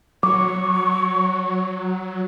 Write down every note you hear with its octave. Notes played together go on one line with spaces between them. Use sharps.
F#3 C#6 D6